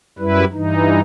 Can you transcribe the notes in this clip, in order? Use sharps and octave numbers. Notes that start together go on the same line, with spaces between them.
F#2 G3 E4 B4
G2 E3 D#4